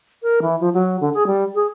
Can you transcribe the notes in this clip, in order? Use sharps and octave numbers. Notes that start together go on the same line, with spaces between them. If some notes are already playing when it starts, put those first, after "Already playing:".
A#4
E3
F3
F#3
D3
G#4
G3
G#4